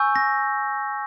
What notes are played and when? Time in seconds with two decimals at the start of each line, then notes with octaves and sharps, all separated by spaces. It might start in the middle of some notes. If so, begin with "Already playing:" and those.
Already playing: G#5 C#6 E6 G6
0.16 A#6